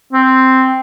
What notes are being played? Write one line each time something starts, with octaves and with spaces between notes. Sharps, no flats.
C4